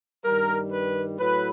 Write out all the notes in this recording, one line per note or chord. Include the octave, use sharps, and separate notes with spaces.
G2 D#3 G3 A#4
B4
A2 F#3 B4